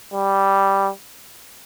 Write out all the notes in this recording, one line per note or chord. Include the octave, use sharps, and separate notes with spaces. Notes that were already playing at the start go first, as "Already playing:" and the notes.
G3